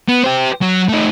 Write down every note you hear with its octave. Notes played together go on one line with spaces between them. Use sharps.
B3
G4 C5
F#3
A3 D#4